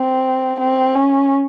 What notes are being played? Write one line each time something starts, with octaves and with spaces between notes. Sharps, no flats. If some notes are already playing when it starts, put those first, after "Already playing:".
Already playing: C4
C4
C#4